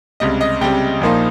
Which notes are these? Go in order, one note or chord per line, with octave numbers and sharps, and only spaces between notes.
C#2 C3 G3 D#5
D#5
C#2 C3 G3 G5
A#1 A#2 F3 A#3 D#4